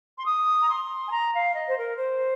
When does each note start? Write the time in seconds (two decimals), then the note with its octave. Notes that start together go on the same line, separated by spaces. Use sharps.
0.18 C6
0.26 D#6
0.60 A#5
0.69 C6
1.07 G#5
1.12 A#5
1.33 F5
1.54 D#5
1.68 C5
1.76 A#4
1.96 C5